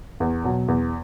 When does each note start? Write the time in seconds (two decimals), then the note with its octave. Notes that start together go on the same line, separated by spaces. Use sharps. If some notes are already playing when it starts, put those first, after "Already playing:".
0.20 E2
0.44 B2 F#3
0.68 E2